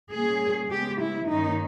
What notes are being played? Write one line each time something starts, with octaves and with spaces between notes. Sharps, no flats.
A#2 G3 A#3 C#4 G#4
C#3 G#3 B3 G4
E4
G2 D#3 A#3 C#4 D#4